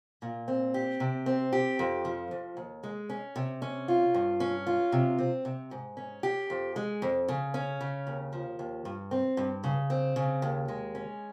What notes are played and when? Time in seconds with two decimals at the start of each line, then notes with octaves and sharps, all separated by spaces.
0.22 A#2
0.48 C4
0.74 G4
1.00 C3
1.26 C4
1.53 G4
1.79 F2
2.05 F3
2.31 F2
2.57 D#2
2.83 G#3
3.10 C#4
3.36 C3
3.62 C#4
3.88 F4
4.14 G2
4.40 C#4
4.67 F4
4.92 C3
5.19 C4
5.45 C3
5.71 G#2
5.97 C#4
6.23 G4
6.50 F2
6.76 G#3
7.02 F2
7.28 C#3
7.54 C#4
7.81 C#3
8.07 D#2
8.33 F3
8.59 D#2
8.85 G2
9.11 C4
9.37 G2
9.64 C#3
9.90 C4
10.16 C#3
10.42 D#2
10.68 G#3
10.95 C#4